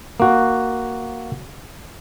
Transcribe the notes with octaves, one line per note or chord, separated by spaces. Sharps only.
A#3 F#4